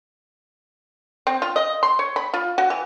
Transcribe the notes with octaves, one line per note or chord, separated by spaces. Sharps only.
C4
F4
D#5
C6
C#5
B5
F4
F#4
E3